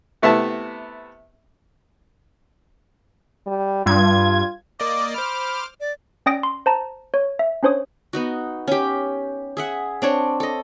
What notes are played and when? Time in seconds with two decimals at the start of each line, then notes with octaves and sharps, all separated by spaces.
0.22 C3 A3 B3 E4 A5
3.47 G3
3.86 G2 F4 G#6
4.80 A#3 D5 D#5 D6
5.14 C5 B5 D6 F6
5.80 D5
6.26 C#4 D5 G5 D#6 A#6 D7
6.43 C6
6.66 C5 A5 A#5
7.14 C#5
7.39 E5
7.63 C#4 D4 C5 C#5 D#6
8.13 B3 D#4 F#4
8.68 C#4 G4
9.57 G#4 E5 F#5
10.02 C4 D4 C#5
10.40 A4 D#5